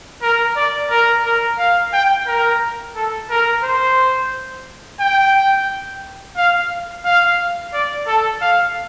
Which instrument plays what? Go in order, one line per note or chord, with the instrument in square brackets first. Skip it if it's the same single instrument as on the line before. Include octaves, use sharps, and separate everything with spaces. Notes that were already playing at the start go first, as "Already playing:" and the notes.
[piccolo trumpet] A#4
D5
A#4
A#4
F5
G5
A#4
A4
A#4
C5
G5
F5
F5
D5
A4
F5